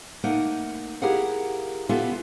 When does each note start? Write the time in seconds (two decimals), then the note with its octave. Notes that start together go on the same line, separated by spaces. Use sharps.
0.23 A3 A#3 D#4 A#4 F#5
1.02 E4 G4 G#4 A#4 F5 F#5
1.89 B3 C#4 E4 F4 G4 A4